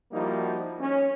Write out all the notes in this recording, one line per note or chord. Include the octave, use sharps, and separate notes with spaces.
F3 G3 A#3 D#4 E4 F#4
C#4